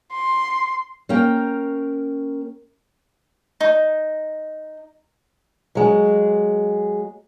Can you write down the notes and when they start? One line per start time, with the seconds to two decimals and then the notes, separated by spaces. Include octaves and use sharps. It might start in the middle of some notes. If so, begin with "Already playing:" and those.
0.13 C6
1.09 A#3 C#4 A#4 G5
3.61 D#4
5.75 F#3 G#3